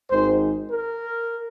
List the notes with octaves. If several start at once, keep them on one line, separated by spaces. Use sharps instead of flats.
G#1 G#2 D#3 G#3 C5
A#4